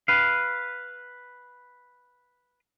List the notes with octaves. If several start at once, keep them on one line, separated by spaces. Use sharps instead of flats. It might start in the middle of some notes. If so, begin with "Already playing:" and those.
B4 F5